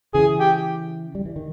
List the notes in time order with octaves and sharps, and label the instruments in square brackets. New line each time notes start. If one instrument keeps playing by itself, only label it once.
[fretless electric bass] C#3 E3 [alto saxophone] G#4
[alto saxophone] G4
[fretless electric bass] G3
E3
D#3